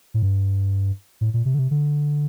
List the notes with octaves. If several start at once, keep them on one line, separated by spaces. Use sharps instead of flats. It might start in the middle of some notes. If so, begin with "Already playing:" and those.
A2
G2
A2
A#2
C3
D3
C3
D3